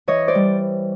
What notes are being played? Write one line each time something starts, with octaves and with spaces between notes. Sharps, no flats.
E3 C#5 D#5
C5 D5
G3